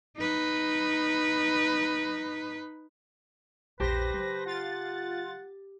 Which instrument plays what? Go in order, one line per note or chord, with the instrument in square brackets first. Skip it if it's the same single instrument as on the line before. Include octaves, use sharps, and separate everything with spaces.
[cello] D#4 B4
[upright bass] A#1 E2 [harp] G4 A5 [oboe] B4 [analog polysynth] C5 A#6
[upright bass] C#3 F#3
[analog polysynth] F4 A6 [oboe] F#5